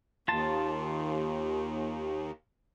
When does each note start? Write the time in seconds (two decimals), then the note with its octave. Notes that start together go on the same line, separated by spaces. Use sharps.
0.28 D#2 F4 A5